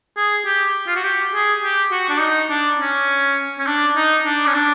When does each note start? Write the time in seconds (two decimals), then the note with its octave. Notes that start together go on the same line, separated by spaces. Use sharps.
0.17 G#4
0.45 G4
0.87 F4
0.96 F#4
1.04 G4
1.33 G#4
1.62 G4
1.92 F#4
2.09 D4
2.20 D#4
2.49 D4
2.79 C#4
3.58 C#4
3.66 D4
3.96 D#4
4.25 D4
4.47 C#4
4.54 D4